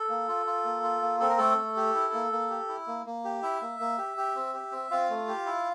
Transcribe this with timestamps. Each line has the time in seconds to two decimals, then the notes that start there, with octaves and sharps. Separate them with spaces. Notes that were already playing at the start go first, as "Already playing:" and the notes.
Already playing: A4
0.09 A#3
0.28 F4
0.46 F4
0.64 A#3
0.83 F4
1.01 A#3
1.20 C4 A4
1.29 A#4
1.38 A3 A4
1.58 A3
1.76 G4
1.95 E4
2.13 A#3
2.32 A#3
2.50 G4
2.69 E4
2.87 A#3
3.06 A#3
3.24 G4
3.42 E4 E5
3.61 A#3
3.80 A#3
3.98 G4
4.17 G4
4.36 C4
4.54 G4
4.72 C4
4.91 C4 F4 F5
5.10 A3
5.28 G4
5.46 E4